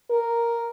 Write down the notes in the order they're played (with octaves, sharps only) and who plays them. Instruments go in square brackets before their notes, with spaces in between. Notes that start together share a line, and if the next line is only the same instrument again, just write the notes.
[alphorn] A#4